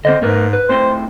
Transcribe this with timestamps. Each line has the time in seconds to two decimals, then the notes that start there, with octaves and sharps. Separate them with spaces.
0.05 D3 C4 C5 D#5
0.22 G#2 A3 A#4 B4
0.53 B4
0.69 A2 C4 C5 C6